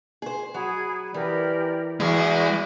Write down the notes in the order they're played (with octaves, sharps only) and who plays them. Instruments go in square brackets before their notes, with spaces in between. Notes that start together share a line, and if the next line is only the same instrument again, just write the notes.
[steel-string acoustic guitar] G#4 C5
[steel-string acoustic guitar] F#3 [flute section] G#4 B5
[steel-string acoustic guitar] E3 [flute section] G4 A#4 D5
[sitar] E2 [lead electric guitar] G#3 [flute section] F#4 D5